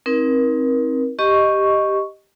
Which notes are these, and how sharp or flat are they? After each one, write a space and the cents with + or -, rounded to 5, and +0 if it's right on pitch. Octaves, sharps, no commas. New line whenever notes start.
C4 +15 D#4 +25 A#4 +30
G4 +0 D#5 +0 C#6 +0